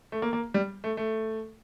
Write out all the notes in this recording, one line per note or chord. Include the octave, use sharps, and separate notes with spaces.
A3
A#3
A#3
G3
A3
A3